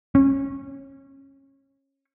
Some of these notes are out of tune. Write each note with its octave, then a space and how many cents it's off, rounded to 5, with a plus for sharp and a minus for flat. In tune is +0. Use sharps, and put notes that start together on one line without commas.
C#4 -20